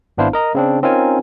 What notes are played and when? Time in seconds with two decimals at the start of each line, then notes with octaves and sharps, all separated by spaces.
0.18 G#1 B3 D4 E4 C5 F5
0.33 A#4 D#5 A#5
0.55 C#3 C4 D4
0.83 C4 C#4 D#4 F4 A#4 G#5